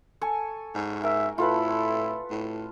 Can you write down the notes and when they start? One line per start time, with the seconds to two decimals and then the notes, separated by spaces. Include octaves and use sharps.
0.21 A4 G#5 C#6
0.74 G#2
1.03 A#4 E5
1.38 A2 E4 F4 A4 B4
2.30 A2